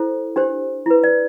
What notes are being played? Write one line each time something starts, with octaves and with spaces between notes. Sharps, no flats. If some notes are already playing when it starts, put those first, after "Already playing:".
Already playing: E4 A4 C5
D4 G4 C5
E4 B4
D5